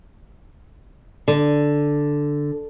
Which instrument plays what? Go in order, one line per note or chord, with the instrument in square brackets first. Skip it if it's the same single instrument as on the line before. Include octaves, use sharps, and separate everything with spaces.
[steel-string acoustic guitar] D3